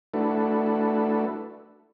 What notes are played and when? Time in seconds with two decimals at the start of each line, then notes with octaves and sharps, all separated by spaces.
0.14 A3 D4 E4 F#4 A4 B4